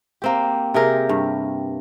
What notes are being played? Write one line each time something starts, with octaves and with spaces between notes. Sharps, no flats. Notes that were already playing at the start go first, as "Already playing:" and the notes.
A#3 C4 G4
C3 G4 G#4 A#4
G2